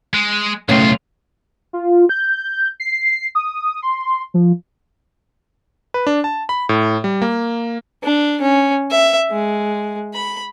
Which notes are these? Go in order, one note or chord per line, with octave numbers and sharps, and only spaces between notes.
G#3
B1 A2 C#3 F4
F4
G6
C7
D#6
C6
F3
B4
D4
A5
B5
A2
G3
A#3
D4
C#4
E5
G#3
B5